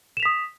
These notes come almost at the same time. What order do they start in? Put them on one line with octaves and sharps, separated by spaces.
E7 F7 B6 D#6